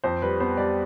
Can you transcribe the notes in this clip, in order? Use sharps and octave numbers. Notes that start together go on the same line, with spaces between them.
F2 C5
G3 B4
B3 C5
G3 D5